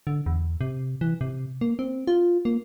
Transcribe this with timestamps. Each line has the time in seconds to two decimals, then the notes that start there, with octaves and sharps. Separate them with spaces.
0.07 D3
0.26 E2
0.61 C3
1.01 E3
1.21 C3
1.61 A#3
1.79 C4
2.07 F4
2.45 A#3